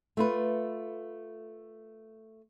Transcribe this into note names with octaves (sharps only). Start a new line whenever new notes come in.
A3 F4 B4